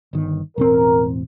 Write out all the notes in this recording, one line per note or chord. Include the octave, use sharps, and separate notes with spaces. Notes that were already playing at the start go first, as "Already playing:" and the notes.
G1 D#3
E1 A1 C4 A#4